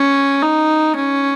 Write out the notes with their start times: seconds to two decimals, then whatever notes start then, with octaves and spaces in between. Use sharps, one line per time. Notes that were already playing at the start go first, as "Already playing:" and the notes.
Already playing: C#4
0.42 D#4
0.96 C#4